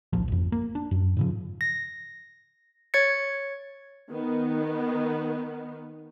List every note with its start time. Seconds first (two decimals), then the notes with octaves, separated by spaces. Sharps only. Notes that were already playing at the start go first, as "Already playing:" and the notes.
0.13 D1 A#1 F3
0.28 G#1 F2
0.52 A#3
0.75 D4
0.91 F#2
1.17 G#2 C#3 F3
1.61 A#6
2.94 C#5 G#6 A6 C#7
4.10 D#3 B3